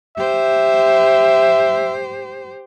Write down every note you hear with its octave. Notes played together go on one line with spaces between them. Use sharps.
G4 C5 E5